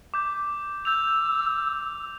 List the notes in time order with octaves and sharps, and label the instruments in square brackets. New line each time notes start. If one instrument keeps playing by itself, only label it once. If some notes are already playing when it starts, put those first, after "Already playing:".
[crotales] D6 G6
[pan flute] E6 [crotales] G6 F7